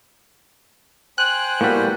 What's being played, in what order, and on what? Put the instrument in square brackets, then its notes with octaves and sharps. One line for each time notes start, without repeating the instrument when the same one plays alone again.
[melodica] C5 G5 G#5 [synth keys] F#6
[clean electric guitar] A2 G3 [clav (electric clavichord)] A#3 B3 F#4